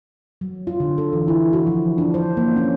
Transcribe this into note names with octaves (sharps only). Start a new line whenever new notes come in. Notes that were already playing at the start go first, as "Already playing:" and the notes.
F#3
F4
D3
A4
E3
E4
F#4
F3
D4
C5
A#3
C#4